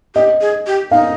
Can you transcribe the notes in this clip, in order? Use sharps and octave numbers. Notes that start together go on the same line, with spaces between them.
G4 D#5
G#4
G4
D#4 F5